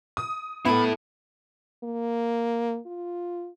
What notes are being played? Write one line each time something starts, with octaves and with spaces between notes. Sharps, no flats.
D#6
B3 E4 A4 B5
A#3
F4